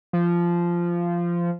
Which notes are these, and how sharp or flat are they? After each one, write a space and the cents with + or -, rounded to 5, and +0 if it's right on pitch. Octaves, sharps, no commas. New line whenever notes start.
F3 -15